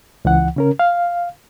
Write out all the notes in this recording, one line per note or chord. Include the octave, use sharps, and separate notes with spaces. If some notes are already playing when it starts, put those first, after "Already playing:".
C#2 E3 F#5
C#3 C#4 A#4
F5